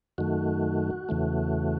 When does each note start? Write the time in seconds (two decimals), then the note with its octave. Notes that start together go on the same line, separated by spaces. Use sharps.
0.18 F#2 D#3 A3 F#4
1.09 E2 C#3 E3 A3